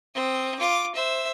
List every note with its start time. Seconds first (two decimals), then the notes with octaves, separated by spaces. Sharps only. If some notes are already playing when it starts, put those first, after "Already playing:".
0.14 C4 D#6
0.59 F4 D6
0.95 C5 E5